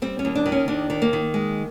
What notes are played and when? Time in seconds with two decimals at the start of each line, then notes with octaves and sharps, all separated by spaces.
0.02 G3 C4
0.19 C#4
0.25 D#2
0.35 D4
0.46 D#3
0.52 C#4
0.68 D#2 D4
0.90 D#3
1.02 A#3
1.13 D#3
1.34 G#3